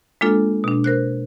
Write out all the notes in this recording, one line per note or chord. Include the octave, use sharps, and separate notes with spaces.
G#3 A#3 D4 F4 A4
B2 D4
A#4 C5 F#6